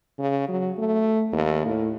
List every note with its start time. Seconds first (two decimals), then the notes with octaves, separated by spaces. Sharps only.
0.19 C#3
0.49 F#3
0.78 A3
1.33 D#2
1.66 A2